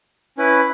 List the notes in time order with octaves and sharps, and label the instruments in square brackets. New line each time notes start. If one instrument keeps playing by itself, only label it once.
[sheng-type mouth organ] C#4 E4 B4